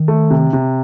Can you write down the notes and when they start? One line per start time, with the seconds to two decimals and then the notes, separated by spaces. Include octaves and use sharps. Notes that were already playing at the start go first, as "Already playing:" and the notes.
Already playing: D#3
0.08 A3
0.31 C3
0.53 C3